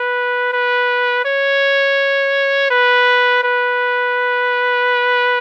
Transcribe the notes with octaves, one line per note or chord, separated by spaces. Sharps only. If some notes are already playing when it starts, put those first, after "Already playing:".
Already playing: B4
B4
C#5
B4
B4